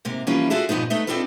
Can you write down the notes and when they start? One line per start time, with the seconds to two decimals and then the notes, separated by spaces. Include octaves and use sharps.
0.05 G#2 C3 A#3
0.27 E3 F3 G3 A#3 C#4 F4
0.50 D4 F4 F#4 G#4 A4 E5
0.69 G2 A#2 F3 B3 D#4
0.90 A3 B3 D#4 E5
1.07 C4 D4 D#4 F4 A4 B4